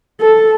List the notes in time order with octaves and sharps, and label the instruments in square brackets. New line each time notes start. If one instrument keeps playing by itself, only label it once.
[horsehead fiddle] A4